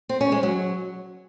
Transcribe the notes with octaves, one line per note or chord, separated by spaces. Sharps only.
C4
C#4
G#3
F#3